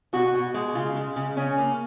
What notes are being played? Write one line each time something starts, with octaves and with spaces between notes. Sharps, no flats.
B2 F#4
B2
G#3
C#3 F4
G#3
C#3
C#3 C#4
A#3